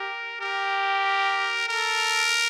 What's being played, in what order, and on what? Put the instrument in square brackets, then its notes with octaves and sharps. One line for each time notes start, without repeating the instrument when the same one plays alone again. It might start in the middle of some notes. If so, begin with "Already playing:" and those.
Already playing: [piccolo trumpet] G4 [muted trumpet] A#4
[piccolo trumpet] G4 [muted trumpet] A#4
[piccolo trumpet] A4 [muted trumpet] A#4